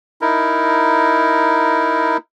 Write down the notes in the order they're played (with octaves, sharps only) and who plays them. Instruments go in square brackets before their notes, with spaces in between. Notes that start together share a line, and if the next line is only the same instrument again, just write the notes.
[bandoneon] D#4 E4 A#4